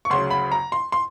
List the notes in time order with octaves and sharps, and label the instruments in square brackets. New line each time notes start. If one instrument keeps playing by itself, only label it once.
[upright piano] C#6
D2 C#3 F#3 C6
B5
A#5
C6
C6